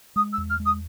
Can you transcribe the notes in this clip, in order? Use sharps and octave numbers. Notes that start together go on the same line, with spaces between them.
G#3 D#6
E6
E2
F6
G#3
D#6